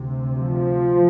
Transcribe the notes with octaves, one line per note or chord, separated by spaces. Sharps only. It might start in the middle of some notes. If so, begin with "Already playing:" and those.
Already playing: D2 C3
F3